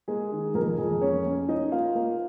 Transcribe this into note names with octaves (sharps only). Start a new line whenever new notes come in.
G#3 A#3 G#4
D#3
F2 A#3 A#4
F2 G#3 G#4
A#3 C#4 C#5
A#3
A#3 D#4 D#5
A#3 F4 F5
A#3